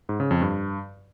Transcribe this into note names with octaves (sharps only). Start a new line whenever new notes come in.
G#2
C#3
F2
G2